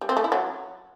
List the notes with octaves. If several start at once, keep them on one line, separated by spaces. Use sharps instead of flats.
G3
C4
A3
E4
F#3